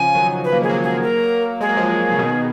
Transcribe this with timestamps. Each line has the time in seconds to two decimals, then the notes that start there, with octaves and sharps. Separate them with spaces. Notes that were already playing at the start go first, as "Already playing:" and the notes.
Already playing: C#3 F3 G#5
0.15 D#3 F#3
0.44 B4
0.52 A#3
0.62 G#3 G#4
0.69 F#3 A#3
0.83 G#4
1.03 A#4
1.61 G#3 G#4
1.69 A#3
1.77 F3 G#3
2.12 C#3
2.19 B2 D#3